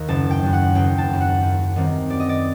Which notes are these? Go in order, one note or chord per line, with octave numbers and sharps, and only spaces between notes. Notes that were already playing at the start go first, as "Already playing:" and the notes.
Already playing: D#2 D#3
F#1 A5
G5
F#2 F#3
F#5
F#1 G5
A5
F#2 F#3
F#5
F#2
D#3 G3 C4
F#2 D5
D#5
D5